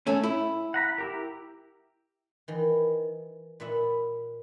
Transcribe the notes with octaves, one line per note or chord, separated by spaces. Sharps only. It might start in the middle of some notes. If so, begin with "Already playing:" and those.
A3 C#4
E4
F#5 A#5 B5
E4 G4 A#4
D#3 E3
A#2 B4 E5 F#5